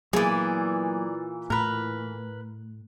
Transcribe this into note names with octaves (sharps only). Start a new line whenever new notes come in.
A#2 E3 F#3 A#3 B3 G#4 D5
A2 A#4 B4